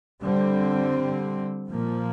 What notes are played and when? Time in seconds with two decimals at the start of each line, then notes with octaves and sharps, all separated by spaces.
0.22 D3 G3 C4
1.70 A#2 F3 A#3